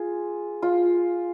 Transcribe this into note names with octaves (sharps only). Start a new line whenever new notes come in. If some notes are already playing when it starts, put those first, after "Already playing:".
Already playing: F4 G#4
F4